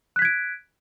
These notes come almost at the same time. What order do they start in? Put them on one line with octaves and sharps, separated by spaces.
F#6 B6 G#6 D7